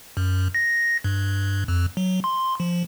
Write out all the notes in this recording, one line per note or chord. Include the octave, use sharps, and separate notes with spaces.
F#2
A#6
G2
F2
F#3
C6
F3